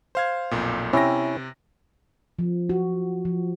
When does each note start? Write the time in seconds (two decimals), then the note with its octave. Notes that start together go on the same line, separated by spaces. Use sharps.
0.15 C5 F5 G#6
0.51 B1 F2 A#2
0.93 C3 C#4 E4 G5 A#6
2.39 F3
2.69 F#4
3.25 F3